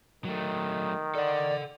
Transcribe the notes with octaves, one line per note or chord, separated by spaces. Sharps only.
D#3 F#3 A3
A4 D5 F#5